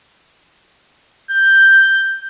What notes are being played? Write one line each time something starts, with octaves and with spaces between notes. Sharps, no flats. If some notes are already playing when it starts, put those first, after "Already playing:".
G6